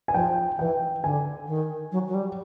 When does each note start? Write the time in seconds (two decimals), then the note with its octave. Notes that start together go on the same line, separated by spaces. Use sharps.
0.08 G#5
0.14 F3 G5
0.58 E3 G5
1.04 D3 G#5
1.47 D#3
1.92 F#3
2.08 F#3
2.14 G3